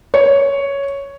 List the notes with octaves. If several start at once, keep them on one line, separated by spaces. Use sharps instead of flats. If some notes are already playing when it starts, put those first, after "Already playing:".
C#5